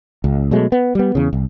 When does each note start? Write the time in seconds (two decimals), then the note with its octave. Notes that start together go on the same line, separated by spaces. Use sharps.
0.24 C#2
0.51 B2 F#3 G#3 A3
0.72 B3
0.95 G3 B3
1.15 E2 C#3
1.33 C2